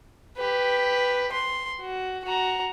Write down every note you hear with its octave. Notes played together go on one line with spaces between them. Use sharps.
G4 B4
C6
F#4
F#4 A#5